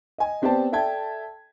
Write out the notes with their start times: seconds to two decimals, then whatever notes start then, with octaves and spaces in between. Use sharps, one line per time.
0.18 D#5 G#5
0.42 B3 C4 G4 C5 D5 A5
0.72 A4 D5 E5 G5 A5 G#6